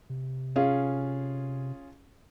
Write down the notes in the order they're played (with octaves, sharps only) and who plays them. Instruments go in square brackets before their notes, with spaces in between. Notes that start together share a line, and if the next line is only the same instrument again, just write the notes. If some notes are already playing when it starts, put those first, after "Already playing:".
[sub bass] C3
[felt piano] C#4 F4 G#4